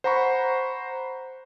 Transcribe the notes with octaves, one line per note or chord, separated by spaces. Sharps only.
C5 F#5 A#5 B5 C#6